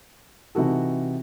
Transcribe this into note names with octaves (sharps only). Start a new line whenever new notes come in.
C3 E3 D#4 F#4 A4